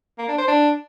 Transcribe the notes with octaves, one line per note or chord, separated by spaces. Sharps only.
A#3
D4
C5
D4